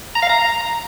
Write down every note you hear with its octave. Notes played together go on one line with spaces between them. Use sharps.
A#5
F5
A#5